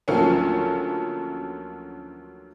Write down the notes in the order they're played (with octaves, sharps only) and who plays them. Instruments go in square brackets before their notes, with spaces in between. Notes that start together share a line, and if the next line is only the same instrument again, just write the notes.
[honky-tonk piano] D2 F3 F#3 A3 A#3 C#4